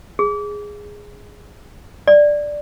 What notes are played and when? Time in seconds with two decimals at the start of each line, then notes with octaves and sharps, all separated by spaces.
0.19 G#4
2.08 D5